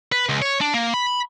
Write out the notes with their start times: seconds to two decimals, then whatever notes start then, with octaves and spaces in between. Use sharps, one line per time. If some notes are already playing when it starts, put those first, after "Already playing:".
0.12 B4
0.29 C#2
0.42 C#5
0.61 D4
0.74 A#3
0.94 B5